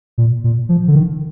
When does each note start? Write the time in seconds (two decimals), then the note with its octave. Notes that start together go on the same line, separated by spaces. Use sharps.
0.18 A#2
0.44 A#2
0.69 F3
0.88 D3
0.95 D#3